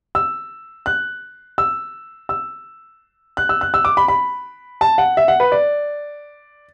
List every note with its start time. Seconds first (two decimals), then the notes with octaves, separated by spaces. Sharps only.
0.15 E6
0.86 F#6
1.58 E6
2.29 E6
3.37 F#6
3.49 E6
3.61 F#6
3.74 E6
3.85 D6
3.97 B5
4.08 B5
4.81 A5
4.98 F#5
5.17 E5
5.28 F#5
5.40 B4
5.52 D5